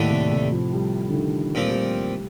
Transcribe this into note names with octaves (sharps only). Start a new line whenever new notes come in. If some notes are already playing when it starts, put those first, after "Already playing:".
Already playing: D#2 A2 D3 A3 D4
C3
C3
F3
G3
D3
D#3
A#2 F3 G3 C4
A3
G3